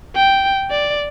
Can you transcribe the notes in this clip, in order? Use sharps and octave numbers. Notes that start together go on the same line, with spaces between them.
G5
D5